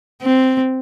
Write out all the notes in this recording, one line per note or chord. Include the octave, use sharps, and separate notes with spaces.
C4